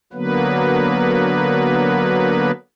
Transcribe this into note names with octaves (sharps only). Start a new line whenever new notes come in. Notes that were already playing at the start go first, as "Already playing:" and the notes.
D3 F#3 A#3 B3 B4